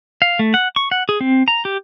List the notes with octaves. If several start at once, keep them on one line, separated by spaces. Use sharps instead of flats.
F5
A3
F#5
C#6
F#5
G#4
C4
A#5
G4